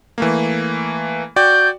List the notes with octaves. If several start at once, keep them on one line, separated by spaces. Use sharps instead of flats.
E3 A3 A#3
F#4 D5 G5 G6